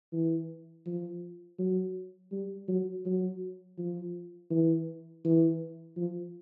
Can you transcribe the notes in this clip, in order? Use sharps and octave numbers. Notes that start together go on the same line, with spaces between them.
E3
F3
F#3
G3
F#3
F#3
F3
E3
E3
F3